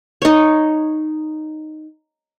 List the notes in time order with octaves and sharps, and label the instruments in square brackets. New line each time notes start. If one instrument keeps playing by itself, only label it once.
[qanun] D#4 C#5